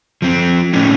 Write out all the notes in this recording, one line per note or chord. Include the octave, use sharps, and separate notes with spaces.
F3 C4
A2 C#4 D#4